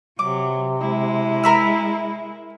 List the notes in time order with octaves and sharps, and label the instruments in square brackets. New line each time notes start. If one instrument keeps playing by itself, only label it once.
[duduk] C3 [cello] F#3 [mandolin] D6
[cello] G#3 [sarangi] E4
[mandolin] A#4 B5 E6